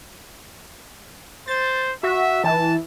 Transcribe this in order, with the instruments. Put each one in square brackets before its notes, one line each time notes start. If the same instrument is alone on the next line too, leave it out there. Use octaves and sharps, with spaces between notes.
[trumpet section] C5 [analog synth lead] A6
[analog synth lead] F#4 [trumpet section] E5
[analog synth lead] E3 [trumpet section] A5